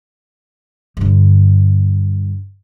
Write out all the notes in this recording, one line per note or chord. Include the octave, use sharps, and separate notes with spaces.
G2 D3